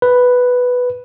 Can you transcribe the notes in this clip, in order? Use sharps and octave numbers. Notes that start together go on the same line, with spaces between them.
B4